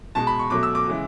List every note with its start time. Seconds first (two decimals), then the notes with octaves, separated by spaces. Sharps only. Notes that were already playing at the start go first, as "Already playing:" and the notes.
0.15 B2 G#3 A5
0.27 B5
0.39 C#6
0.50 B2 F#3 A3 D6
0.63 E6
0.75 D6
0.88 C#3 E3 G#3